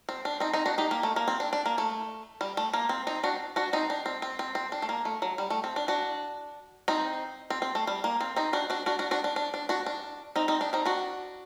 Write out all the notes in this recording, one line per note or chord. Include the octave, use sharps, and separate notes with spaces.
C4
D4
C4 D#4
C4 D#4
D4 F#4
D#4 G4
A#3
A3
A#3
C4
D4
D4
A#3
A3
G3
A3
A#3
C4
C4 D#4
D4 F#4
D4 F#4
C4 D#4
D4
C4
C4
C4
C4
D4
A3
A#3
A3
F#3
G3
A3
C4
D4
D4 F#4
C4 D#4
C4
C4
A3
G3
A#3
C4
C4 D#4
D4 F#4
D4 F#4
D4 F#4
D4 F#4
D4 F#4
D4
D4
D4
D4 F#4
D4
C4 D#4
C4 D#4
D4
C4 D#4
D4 F#4